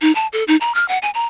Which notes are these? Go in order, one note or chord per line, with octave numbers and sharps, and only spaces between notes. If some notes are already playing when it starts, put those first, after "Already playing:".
D#4
A5
A4
D#4
A#5
F6
F#5
G#5
A#5